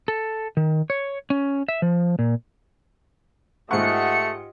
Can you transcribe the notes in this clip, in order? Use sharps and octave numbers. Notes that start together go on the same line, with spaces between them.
A4
D#3
C#5
C#4
E5
F3
A#2
G#2 A3 F4 G4 D#5 F#5 C#6 C#7